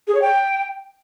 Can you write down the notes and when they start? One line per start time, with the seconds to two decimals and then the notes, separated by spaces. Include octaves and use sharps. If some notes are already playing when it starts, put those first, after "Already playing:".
0.08 G#4
0.15 C#5
0.22 G5